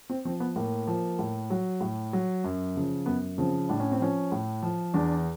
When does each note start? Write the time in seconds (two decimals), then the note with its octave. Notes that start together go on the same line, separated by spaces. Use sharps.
0.10 C4
0.25 F3 C4
0.40 B3
0.56 A2 A#3
0.87 F3
1.19 A2
1.50 F#3
1.81 A2
2.13 F#3
2.44 F#2
2.76 C#3 F3
3.06 F#2 B3
3.38 C#3 F3 C4
3.69 A2 D4
3.80 C#4
3.92 C4
4.00 F3 C#4
4.32 A2
4.62 F3
4.94 E2 D4